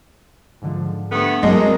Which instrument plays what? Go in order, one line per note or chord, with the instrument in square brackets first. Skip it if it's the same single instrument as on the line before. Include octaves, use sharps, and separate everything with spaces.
[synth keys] G#2 D3 F3
[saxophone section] G2 A3 B3
[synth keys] B1 G2 F#3 [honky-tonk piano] G#3 [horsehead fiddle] C4 A#4 [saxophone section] D4 D#5